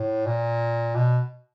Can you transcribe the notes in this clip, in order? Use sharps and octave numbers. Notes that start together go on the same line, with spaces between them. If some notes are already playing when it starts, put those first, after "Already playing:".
Already playing: A2
A#2
B2